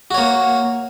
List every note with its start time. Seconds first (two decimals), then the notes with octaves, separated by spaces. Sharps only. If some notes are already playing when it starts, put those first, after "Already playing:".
0.11 F#4
0.14 C#5
0.18 A#3